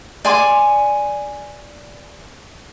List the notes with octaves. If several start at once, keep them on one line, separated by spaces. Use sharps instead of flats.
D5 G#5 C6 D6